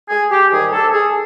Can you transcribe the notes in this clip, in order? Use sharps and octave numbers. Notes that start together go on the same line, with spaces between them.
G#4
G4
G#2 D#3 G3 G#4
A4
G#4